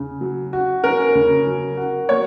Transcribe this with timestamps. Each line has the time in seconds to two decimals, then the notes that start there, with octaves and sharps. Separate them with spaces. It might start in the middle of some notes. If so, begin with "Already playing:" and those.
Already playing: C#3
0.21 F#3
0.53 F#4
0.84 C#4 A#4
1.15 C#3
1.47 F#3
1.77 F#4
2.09 A#3 C#5